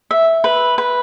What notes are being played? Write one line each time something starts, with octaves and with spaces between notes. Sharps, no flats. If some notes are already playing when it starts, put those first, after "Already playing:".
E5
B4
B4